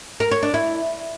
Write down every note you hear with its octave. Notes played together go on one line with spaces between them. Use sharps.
A#4
C#5
D4
E4